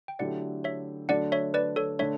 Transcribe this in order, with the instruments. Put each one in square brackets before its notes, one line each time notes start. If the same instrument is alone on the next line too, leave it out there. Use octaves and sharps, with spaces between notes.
[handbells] G5
[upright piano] D3 F#3 A3 E4 G4 [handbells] D5 F#5
[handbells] C#5 E5
[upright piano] D3 F#3 A3 D4 [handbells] D5 F#5
[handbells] C#5 E5
B4 D5
A4 C#5
[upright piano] D3 A3 D4 [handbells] C#5 E5